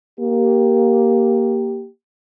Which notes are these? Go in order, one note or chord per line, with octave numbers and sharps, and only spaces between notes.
A#3 G4